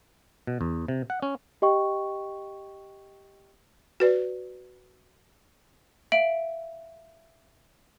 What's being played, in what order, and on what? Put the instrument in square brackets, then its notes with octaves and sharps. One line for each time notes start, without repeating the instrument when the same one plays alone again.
[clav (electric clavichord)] B2
E2
C3
F#5
C#4
[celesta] G4 D#5 G5 C#6
[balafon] F#4 B4 D5
[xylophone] E5 F5 D7 F#7